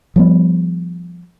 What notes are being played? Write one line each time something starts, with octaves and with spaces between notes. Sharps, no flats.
F3 G3 B3